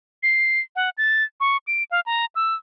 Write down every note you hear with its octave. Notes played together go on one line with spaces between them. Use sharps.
C7
F#5
A6
C#6
D7
F5
A#5
E6